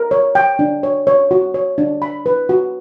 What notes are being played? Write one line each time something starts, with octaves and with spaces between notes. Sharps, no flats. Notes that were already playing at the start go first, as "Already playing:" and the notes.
Already playing: A#4
C#5
G5
D4
C#5
C#5
F#4
C#5
D4
B5
B4
F#4